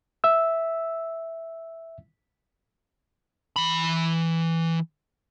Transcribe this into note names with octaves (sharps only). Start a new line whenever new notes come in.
E5 E6
E3 B5